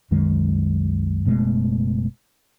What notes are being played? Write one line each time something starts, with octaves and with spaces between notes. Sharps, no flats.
C2 F#2 D#3 G#3
F#1 B2 G#3 A3